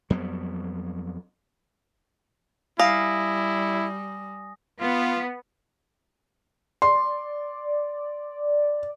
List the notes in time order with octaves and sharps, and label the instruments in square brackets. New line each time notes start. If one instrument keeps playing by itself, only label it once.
[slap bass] F2 F#3 G3 B3
[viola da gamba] G3 [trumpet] E4 [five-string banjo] F5 [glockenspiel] G#5 D#6 A#6
[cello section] B3 [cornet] F4
[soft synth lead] D5 [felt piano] C6